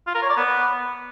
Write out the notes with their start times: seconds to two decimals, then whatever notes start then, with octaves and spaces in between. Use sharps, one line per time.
0.07 F4
0.15 A#4
0.22 C#5
0.30 D5
0.37 B3